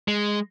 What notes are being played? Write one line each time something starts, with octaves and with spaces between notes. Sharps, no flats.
G#3